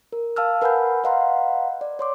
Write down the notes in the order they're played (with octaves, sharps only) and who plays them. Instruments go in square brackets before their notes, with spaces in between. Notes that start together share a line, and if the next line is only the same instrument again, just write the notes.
[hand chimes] A#4
F5 A5 E6 F6
A#4 B4 F#5 G#5 B5 G6
B4 D#5 F5 F#5 A#5 C6
D5
C#5 C6 D6